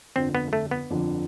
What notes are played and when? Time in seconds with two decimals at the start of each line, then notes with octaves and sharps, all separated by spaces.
0.16 G1 F2 D3 F3 C4
0.35 B3
0.53 A3
0.71 B3
0.90 G1 F2 D3 F3